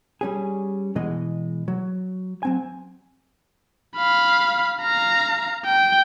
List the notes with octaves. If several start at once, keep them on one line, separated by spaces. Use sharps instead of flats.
G3 C#4 G#4
B2 E3 G#3 D#5
F#3
F#3 C4 G#5
F5 B5
F5 A#5
G5